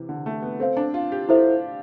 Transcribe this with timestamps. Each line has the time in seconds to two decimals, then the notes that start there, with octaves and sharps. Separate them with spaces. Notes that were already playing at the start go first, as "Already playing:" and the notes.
Already playing: C3 E3
0.09 D3
0.26 A3
0.42 B3
0.60 C4 A4 C5 F5
0.77 D4
0.94 F4
1.12 G4
1.29 E4 A4 C5 E5